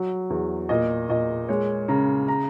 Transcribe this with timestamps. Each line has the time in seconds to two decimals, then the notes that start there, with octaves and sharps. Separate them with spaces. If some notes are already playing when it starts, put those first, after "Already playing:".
Already playing: F#3
0.30 E2
0.69 A#2 D#5
1.09 A#2 D#5
1.48 G#3 C#5
1.88 C#3 A#5
2.28 A#5